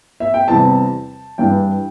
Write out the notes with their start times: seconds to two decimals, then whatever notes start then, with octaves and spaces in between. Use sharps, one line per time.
0.20 E5
0.34 G5
0.48 E2 C3 G3 C4 A5
1.38 G2 E3 G3 D4 G5